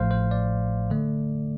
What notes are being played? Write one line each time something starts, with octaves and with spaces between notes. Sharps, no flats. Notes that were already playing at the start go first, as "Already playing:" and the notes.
Already playing: A1 A2 F3 A3 C5 F5
C5
D5
D3 A3